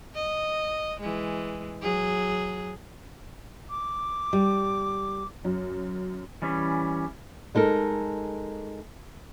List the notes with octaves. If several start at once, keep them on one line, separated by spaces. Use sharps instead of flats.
D#5
E3 G#3
F#3 G#4
D6
G3
F#2
E3 G3 C#4
G#3 D#4 A4 A#4